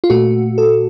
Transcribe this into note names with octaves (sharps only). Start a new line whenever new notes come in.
F4
A#2 A3 F#4
A4